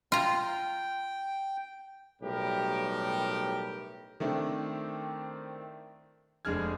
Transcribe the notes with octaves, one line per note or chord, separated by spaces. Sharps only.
F4 G5 A#5
B1 A2 G3 G4 A#4
D#3 A3 C4 D4 E4
F1 G#3 D4 G#4 F6 G#6